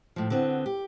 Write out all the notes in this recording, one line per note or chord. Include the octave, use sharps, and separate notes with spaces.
A2 F3
D3 B3 C4
G4